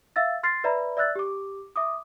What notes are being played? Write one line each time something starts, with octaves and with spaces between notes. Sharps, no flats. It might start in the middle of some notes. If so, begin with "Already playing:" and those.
E5 F5 E6 A6
C6 F6 A6 C7
B4 D5 E5 A#5 B5
D5 E5 E6 F#6 A6
G4 D6
E5 D6 D#6